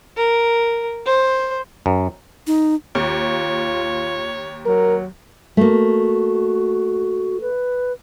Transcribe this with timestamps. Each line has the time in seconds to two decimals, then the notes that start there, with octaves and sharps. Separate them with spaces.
0.16 A#4
1.06 C5
1.86 F#2
2.47 D#4
2.95 D#2 F4 C#5
4.66 F#3 A#4
5.57 A3 A#3 F#4
7.41 B4